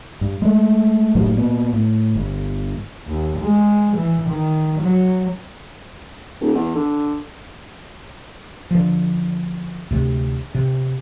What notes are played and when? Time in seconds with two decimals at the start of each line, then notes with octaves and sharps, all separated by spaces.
0.21 G2
0.42 G#3 A3
1.15 F#1 A2 F#3 G3
1.37 A#2 B3
1.73 A2
2.15 G1
3.07 D#2
3.39 G#3
3.97 E3
4.29 D#3
4.81 F#3
6.41 D#1
6.55 E2
6.75 D3
8.71 D3 F3
9.91 D2 C3
10.55 C3